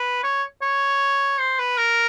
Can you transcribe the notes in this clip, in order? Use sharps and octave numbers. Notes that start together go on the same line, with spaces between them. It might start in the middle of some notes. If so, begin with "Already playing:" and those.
Already playing: B4
C#5
C#5
C5
B4
A#4